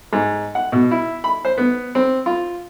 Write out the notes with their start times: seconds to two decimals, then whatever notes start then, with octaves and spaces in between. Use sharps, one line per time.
0.13 G#2
0.55 F#5
0.72 B2
0.91 E4
1.24 B5
1.45 C5
1.58 B3
1.95 C4
2.26 F4